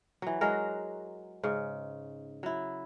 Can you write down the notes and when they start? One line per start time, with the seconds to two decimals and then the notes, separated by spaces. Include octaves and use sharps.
0.22 E3 F#3
0.41 F#3 G#3 F#4 A#4
1.43 G#2 C#3
2.43 F#3 E4